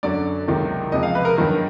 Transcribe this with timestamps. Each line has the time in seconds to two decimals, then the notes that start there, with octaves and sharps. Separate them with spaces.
0.03 F#2 D3 F#3 D5
0.47 C#2 C3 D#3 F#3
0.92 C#2 C3 F3 D#5
1.03 F5
1.15 B4
1.25 A#4
1.36 G2 D#3 F#3 A#4